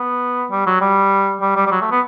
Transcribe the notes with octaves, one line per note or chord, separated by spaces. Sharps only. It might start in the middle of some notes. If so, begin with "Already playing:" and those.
Already playing: B3
G3
F#3
G3
G3
G3
G3
F#3
A3
B3